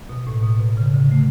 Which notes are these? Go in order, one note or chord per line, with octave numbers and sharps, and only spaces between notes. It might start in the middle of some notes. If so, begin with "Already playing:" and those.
B2
A2
B2
B2
C#3
D3
A3